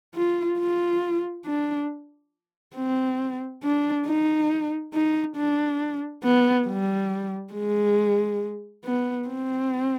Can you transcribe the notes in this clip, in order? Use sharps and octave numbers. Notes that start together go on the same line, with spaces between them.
F4
F4
D4
C4
D4
D#4
D#4
D4
B3
G3
G#3
B3
C4